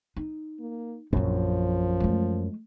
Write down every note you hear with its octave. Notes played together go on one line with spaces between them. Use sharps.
D#4
A#3
A#1 F#2 F3 C#4
G#3 A3